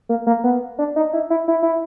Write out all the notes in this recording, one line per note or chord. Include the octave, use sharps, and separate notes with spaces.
A#3
A#3
B3
D4
D#4
E4
E4
E4
E4